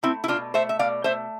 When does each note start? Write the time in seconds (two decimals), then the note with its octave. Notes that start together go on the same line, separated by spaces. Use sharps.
0.03 A3 C4 E4
0.24 E4
0.28 B2 D4 F4
0.54 A3 C5 E5
0.69 E5
0.79 B2 D5 F5
1.04 A3 C5 E5